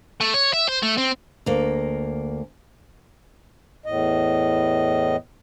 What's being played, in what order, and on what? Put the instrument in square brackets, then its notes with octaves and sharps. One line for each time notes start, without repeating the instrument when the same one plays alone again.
[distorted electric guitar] A3
C#5
E5
C5
A3
C4
[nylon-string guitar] D2 A#3
[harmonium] E2 A2 D#5